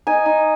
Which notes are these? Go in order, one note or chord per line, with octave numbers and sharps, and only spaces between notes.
D#4 G#5
D#4